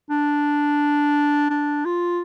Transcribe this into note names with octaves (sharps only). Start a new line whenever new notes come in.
D4
D4
F4